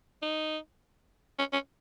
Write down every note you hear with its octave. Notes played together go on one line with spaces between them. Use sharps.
D#4
C#4
C#4